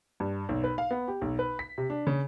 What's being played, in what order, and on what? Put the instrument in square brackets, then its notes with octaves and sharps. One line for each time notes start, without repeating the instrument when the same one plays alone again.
[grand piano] G2
B1
B4
F5
B3
G4
B1
B4
B6
C3
D4
C#3